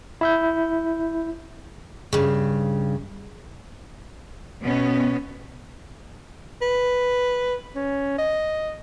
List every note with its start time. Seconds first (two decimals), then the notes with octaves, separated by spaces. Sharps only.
0.21 E4 E5 G6
2.13 G2 C#3
4.61 B2 B3 C#4
6.62 B4
7.75 C#4
8.18 D#5